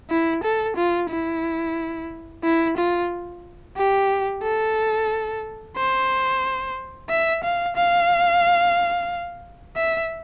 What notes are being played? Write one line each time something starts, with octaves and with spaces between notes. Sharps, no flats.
E4
A4
F4
E4
E4
F4
G4
A4
C5
E5
F5
F5
E5